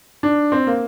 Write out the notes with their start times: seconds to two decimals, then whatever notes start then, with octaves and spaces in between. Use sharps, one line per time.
0.23 D4
0.52 C4
0.67 A#3